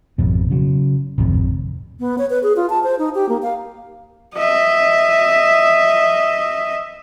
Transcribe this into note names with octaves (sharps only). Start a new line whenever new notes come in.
G#1 F2 B2
C#3 F#3
D1 G#1 F2 C3
B3
C#5
B4
G#4
F4
A5
C5
D#4
G4
A#3
F5
D#5 E5